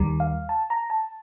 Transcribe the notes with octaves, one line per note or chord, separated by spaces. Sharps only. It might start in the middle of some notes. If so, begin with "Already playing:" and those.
Already playing: D#2 D#3 G3
F5
A5
A#5
A5